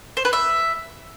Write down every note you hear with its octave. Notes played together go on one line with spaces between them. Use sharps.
C5
B4
E5